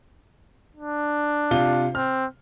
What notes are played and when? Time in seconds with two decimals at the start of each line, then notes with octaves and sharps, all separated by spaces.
0.76 D4
1.51 C3 F4 G7
1.95 C4 F6